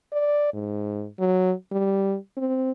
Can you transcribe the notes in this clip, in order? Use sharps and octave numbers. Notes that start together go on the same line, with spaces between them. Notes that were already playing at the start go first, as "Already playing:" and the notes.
D5
G#2
F#3
G3
C4